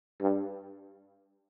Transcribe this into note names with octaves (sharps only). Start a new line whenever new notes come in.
G2